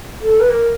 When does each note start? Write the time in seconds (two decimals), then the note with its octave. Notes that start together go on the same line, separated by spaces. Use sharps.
0.22 A4
0.40 B4
0.49 A#4